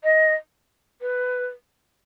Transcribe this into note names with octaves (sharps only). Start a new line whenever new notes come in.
D#5
B4